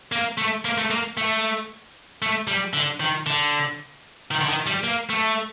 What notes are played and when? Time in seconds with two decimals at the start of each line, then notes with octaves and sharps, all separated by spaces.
0.12 A#3
0.38 A3
0.65 A#3
0.78 A3
0.91 A#3
1.17 A3
2.22 A3
2.47 G3
2.74 D3
3.00 D#3
3.27 D3
4.31 D#3
4.41 D3
4.49 D#3
4.66 G3
4.84 A#3
5.10 A3